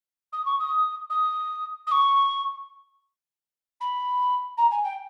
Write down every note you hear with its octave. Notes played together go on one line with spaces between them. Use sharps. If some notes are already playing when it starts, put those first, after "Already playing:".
D#6
C#6
D#6
D#6
D#6
C#6
B5
A#5
G#5
G5